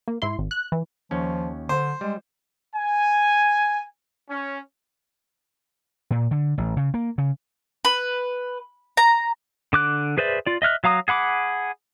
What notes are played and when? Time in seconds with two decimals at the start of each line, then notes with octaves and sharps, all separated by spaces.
0.08 A#3
0.22 G#2 E4 C6
0.39 G#1
0.51 F#6
0.72 E3
1.11 D#2 F3 C#4
1.69 D3 C5
2.01 G3 G#3
2.76 G#5
4.30 C#4
6.11 A#2
6.31 D3
6.58 A1
6.77 C#3
6.94 A#3
7.18 C#3
7.85 B4
8.97 A#5
9.73 D3 D6 F#6
10.18 G#4 B4 C5 D5 E5
10.46 F4 D5
10.62 D#5 E5 F6 F#6
10.84 F#3 F5 A#5 D#6
11.08 G#4 F#5 B5 D6